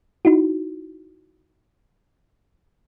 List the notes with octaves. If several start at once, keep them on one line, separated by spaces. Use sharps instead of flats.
D#4 E4 F#4